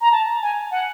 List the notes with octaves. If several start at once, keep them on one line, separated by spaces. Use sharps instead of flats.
A#5
A5
G#5
F#5